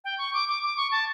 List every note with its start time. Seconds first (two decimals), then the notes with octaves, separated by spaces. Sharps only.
0.04 G5
0.18 C#6
0.34 D6
0.49 D6
0.63 D6
0.77 C#6
0.91 A5